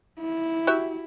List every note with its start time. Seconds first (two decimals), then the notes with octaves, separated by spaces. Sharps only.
0.20 E4
0.67 F#4 G4 E5